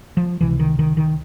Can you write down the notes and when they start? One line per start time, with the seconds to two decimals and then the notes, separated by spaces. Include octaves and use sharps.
0.17 F3
0.41 C#2 C3 E3
0.60 D#3
0.79 D#3
0.97 D#3